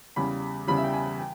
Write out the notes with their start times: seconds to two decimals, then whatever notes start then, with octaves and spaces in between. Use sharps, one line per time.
0.16 E2 C#3 G3 B5
0.67 E2 C#3 G3 B5
0.77 E5
0.84 G5
0.94 G#5
1.18 G5